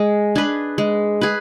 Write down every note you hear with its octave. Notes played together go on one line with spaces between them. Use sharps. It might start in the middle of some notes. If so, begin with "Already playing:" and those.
Already playing: G#3
D4 G#4 B4
G#3
G#4 B4